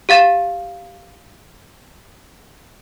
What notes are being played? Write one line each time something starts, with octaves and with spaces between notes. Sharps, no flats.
G4 F5 A6 E7